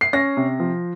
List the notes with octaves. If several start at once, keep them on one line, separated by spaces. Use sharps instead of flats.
C7
C#4 A#6
C3
F3